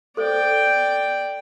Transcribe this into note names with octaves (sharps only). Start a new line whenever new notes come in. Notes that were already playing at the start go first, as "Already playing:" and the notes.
A4 C5 D5 G5